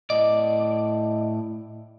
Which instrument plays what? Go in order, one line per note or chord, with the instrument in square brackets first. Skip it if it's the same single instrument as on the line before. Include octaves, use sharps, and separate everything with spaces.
[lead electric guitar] A2 D5 [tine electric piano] D#5